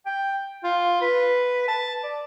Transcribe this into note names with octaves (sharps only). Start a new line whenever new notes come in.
G5
F4
B4
A5
D5